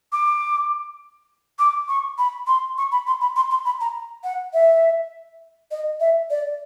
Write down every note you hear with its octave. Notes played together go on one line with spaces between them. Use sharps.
D6
D6
C#6
B5
C6
C#6
B5
C6
B5
C6
C6
B5
A#5
F#5
E5
D#5
E5
D5